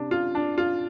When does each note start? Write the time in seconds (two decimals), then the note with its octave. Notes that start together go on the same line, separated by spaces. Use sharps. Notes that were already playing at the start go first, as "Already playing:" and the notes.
Already playing: C3 D4
0.11 F4
0.35 D4
0.58 F4